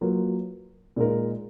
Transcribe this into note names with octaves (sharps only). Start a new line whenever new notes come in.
F#3 A#3 F4 B4
A#2 G#3 D#4 A#4